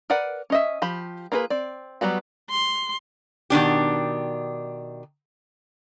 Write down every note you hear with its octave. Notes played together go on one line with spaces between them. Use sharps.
A#4 B4 D5 F#5
C#4 D#5 E5
F3 G4 B5
A#3 D4 F4 G#4 B4
C4 D5
F#3 G3 B3 F#4
C6
B2 D#3 D4 G4